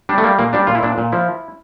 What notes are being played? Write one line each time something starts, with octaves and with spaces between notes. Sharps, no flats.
G3 D4
A3
G3 A#3
A#2 A#3
G3 D4
A#2 F4
E4
A#2 D4
A#2
F3 E4